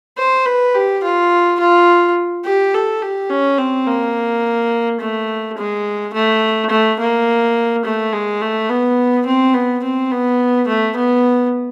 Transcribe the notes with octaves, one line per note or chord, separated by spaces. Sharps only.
C5
B4
G4
F4
F4
G4
A4
G4
C#4
C4
A#3
A3
G#3
A3
A3
A#3
A3
G#3
A3
B3
C4
B3
C4
B3
A3
B3